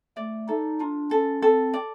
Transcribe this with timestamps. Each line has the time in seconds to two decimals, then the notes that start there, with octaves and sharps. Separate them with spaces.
0.17 A3 D5
0.48 D#4 A4
0.80 D4 F4
1.11 C#4 A4
1.42 C4 A4
1.74 D5